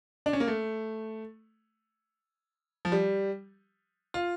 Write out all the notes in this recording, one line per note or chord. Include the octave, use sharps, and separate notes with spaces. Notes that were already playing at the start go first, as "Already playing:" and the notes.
D4
C#4
A#3
A3
F3
G3
F4